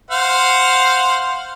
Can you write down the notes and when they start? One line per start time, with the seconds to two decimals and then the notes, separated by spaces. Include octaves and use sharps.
0.11 C5 F5 F#5